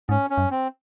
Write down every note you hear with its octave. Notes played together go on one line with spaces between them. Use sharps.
G#2 C#4
C#4
F#2
C4